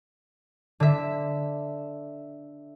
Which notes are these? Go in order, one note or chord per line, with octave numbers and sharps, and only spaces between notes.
D3 E5